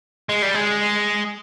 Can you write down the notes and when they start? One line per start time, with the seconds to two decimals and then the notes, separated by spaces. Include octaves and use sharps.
0.29 G#3
0.42 G3
0.54 G#3